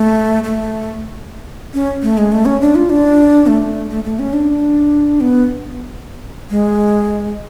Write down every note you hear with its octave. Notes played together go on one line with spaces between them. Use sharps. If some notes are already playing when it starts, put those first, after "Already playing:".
Already playing: A3
A3
C#4
A3
G#3
A3
C#4
D4
F4
D4
A3
A3
A3
C#4
D4
B3
G#3